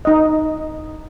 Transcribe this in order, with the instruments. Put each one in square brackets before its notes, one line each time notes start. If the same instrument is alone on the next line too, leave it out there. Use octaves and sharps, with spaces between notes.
[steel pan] D#4 D#5